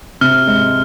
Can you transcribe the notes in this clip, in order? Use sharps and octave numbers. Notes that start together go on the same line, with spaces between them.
C3 F6
G#3